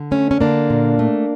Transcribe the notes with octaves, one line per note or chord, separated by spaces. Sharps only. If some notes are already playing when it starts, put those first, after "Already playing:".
Already playing: D3
A3 C#4
C#4
D3 A#3 D4
A#2
A3